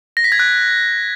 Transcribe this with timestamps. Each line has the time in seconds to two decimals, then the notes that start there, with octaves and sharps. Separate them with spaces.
0.17 A#6
0.24 B6
0.32 G#6
0.39 F#6